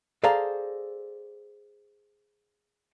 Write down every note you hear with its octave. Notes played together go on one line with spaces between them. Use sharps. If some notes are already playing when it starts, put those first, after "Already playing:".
G#4 A4 C5 D5 F5 A#5